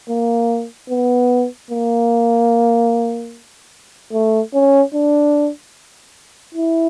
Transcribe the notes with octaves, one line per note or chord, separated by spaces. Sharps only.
A#3
B3
A#3
A3
C#4
D4
E4